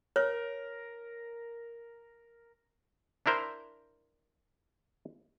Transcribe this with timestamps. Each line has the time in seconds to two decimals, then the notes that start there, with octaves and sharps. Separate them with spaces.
0.16 A#4 C#5
3.26 D4 E4 A#4 C5